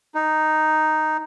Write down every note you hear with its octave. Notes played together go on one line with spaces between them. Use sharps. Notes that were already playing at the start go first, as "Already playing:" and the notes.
D#4